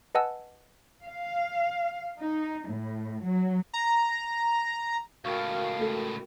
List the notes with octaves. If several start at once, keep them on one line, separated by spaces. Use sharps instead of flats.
B4 D#5 F#5 G#5 A5 E6
F5
D#4
A2
F#3
A#5
C#2 A2 F#4 A#4 F5 G5 C#6
A3 A4